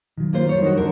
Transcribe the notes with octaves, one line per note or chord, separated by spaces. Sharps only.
D#3 F#3
A#3 F4 C5
F#3 G3 C#5
D#3 F#4
F2 D3 A#4